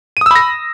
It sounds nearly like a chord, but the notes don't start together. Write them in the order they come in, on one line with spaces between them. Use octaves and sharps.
D#7 D#6 E6 B5 A#6